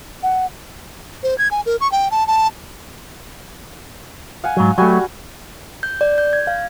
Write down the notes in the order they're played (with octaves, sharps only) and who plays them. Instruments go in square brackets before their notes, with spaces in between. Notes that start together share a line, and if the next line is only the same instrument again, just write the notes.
[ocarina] F#5
[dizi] C5
G#6
G#5
A#4
C#6
G5
A5
A5
[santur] F5 F#5 G#5
[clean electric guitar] G#2 F#3
[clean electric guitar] F#3 A3 [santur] G3 F#4 G#5
[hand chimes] G6
D5
G6
G#6
F5